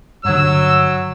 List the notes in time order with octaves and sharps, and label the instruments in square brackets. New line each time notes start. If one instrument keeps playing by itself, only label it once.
[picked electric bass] G2 D3 [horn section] F#3 [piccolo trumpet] E6